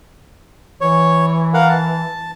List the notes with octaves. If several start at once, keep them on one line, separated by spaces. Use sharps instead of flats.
E3 C#5
A#4 F5 F#5
A5